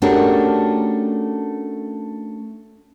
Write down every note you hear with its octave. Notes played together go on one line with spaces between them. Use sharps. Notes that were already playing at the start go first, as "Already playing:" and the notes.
A3 C#4 D4 F#4 G4 A#4